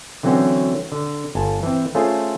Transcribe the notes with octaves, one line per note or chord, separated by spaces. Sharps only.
D3 E3 F#3 C4 C#4 F#4
D3
G1 G#5 A5
E3 C4
A3 C#4 F4 G#4 C5